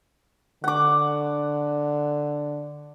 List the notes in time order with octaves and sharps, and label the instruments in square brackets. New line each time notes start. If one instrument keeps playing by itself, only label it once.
[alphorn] D3 [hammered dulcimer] F#5 D6